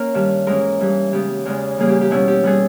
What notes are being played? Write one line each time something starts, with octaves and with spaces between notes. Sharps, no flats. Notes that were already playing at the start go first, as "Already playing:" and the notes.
Already playing: A#3 C#4 A#4
G2 D#3 G3
G#2 E3 G#3 C#4 A#4
G2 E3 G3
C#3 G#3 B3 G4
E2 C#3 G#3
C#3 E3 G3 A#3 G#4
G4
G4
B2 G3 C#4 E4
G4
B2 G3 B3 G#4